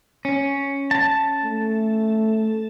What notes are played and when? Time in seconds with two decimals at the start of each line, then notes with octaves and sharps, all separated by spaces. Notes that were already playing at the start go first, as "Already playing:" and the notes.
0.25 C#4
0.91 A5
1.44 A3